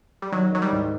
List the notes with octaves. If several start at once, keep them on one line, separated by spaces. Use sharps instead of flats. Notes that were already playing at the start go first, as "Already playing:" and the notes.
G3
D#3 F#3
D#3 F#3
G3
G#2